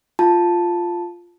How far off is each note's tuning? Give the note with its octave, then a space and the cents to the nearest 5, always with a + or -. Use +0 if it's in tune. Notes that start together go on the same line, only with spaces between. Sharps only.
F4 +0 A5 +0